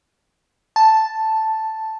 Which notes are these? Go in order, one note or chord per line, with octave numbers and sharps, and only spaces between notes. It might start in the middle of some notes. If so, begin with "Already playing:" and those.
A5